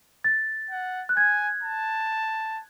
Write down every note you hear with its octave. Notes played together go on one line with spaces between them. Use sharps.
A6
F#5
F#6
G#5 G#6
A5